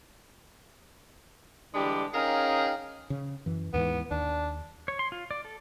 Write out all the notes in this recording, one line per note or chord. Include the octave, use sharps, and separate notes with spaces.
D3 E3 G3 G#3 D4 G4
C#4 D#4 G#4 A#4 F5 G5
C#3
F#2 E3
D#2 G#2 E3 B3
D#2 D4
C#5
C6
F4
D5
A4